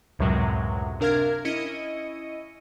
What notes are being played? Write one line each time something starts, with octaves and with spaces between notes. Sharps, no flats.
C#2 F#2 A2 C3 F#3 G#3
C3 D4 A#4 F5 F6 G#6
C#4 E4 D#5 C#7 D#7